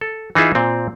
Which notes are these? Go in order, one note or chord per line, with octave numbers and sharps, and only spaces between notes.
A4
E3 D#4 F4 G#4 E5
A#2 C4